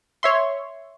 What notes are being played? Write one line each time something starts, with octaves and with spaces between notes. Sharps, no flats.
C#5 E5 C6